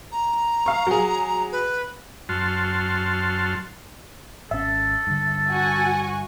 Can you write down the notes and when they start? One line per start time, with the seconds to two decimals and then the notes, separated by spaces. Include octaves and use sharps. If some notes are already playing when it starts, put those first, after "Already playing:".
0.12 A#5
0.66 F5 C#6
0.87 F#3 G#4
1.52 B4
2.29 F#2 F#4 A5 C6 F6
4.51 G#1 C#4 A4 E5
5.07 G2 D3
5.48 F#4 G#5 C#6